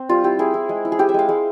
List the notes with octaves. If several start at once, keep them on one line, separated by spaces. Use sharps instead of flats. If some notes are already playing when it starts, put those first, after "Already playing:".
Already playing: C4
G3 F4
E4 G4
E4 G#4
E4
G#3
E4
G#4
E4 G4
E5
G#3 F5
G#3